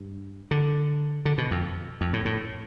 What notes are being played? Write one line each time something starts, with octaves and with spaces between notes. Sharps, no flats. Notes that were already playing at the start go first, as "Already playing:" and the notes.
Already playing: G2
D3
D3
B2
F2
F2
A2
A2